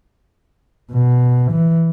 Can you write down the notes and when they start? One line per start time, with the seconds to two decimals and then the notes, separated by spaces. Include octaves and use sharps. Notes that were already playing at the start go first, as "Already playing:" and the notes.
0.91 B2
1.52 E3